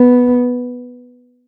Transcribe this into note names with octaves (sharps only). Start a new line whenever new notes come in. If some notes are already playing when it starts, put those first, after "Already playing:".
Already playing: B3